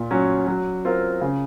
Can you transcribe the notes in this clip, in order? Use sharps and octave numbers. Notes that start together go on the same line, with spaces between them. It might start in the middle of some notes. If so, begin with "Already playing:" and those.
Already playing: A#2
F#3 C#4
F#3
C4 F4 A#4
C#3